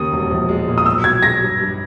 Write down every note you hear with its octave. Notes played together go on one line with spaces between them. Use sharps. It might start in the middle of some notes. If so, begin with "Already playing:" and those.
Already playing: D#2 C#3 A#3 D#6
E1
A#1
G#3
A#2
D#6
B1 E6
B2 G#6
G#3 A#6
G2
G2